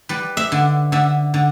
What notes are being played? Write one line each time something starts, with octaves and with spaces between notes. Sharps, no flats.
G3 B4
E5
D3
D3 E5
D3